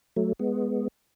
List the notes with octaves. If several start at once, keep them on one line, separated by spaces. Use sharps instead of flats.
F#3 A3
G#3 B3